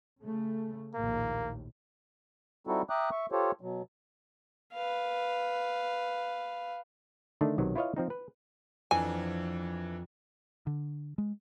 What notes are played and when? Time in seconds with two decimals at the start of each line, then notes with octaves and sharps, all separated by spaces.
0.22 C#3 A3
0.94 A#1 D#2 A2 A#3
2.67 G3 C4 D#4 E4 F#4 A4
2.90 E5 G5 A#5 D6 D#6 F#6
3.11 E5 C#6
3.32 F4 G4 A4 C5 C#5
3.61 B2 F#3
4.73 B4 F5
7.41 D3 D#3 A3 D4
7.58 B1 C3 D#3 F#3
7.76 E4 F4 B4 C#5 D#5 F5
7.96 F3 C4 D#4
8.10 B4
8.91 F2 E3 D4 G#5
10.67 D3
11.18 G#3